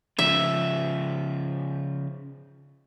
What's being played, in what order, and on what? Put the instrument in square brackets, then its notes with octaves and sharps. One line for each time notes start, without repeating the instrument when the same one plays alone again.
[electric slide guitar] C#3 F3 [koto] E5